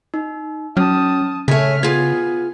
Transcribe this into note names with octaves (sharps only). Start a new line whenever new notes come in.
D#4
F#3 C#4 A5 D#6 F6
C#3 A3 C#5 G#5 F6 B6
B3 F4 G#4 G#6